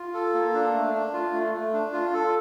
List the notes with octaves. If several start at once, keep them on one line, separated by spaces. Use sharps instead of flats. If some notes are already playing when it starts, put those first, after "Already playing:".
Already playing: F4
A4
A#3
D4
A3
D4
F4
A3
A3
D4
F4
A4